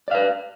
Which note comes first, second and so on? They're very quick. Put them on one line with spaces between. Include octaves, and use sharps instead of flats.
D5 F5 B4